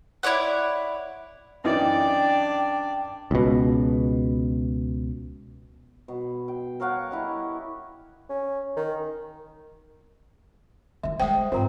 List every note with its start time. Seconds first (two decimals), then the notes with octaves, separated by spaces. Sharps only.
0.23 E4 C#5 D5 F#5
1.64 F#2 E3 D4 D#4 D5 G5
3.31 C#2 B2
6.08 B2
6.48 G5
6.80 A#4 C#5 F5 F#5
7.11 E4 G4 D#5
8.29 C#4
8.77 D#3
11.03 D#3 F#3 E5
11.20 G3 G#3 C5 F#5 G5 D#6
11.52 G#2 F3 C4 F4 A#4 A#5